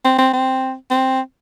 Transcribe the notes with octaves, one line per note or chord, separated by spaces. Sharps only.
C4
C4
C4
C4